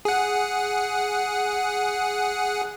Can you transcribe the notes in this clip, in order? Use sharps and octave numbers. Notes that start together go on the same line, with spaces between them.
G#4 F#5